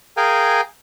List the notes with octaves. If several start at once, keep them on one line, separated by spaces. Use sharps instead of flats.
G#4 A#4 F5 G5 G#5